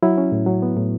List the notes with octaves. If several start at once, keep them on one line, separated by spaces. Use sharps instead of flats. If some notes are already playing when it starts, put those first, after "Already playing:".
F#3 E4
C#4
A2
F#3
B3
A2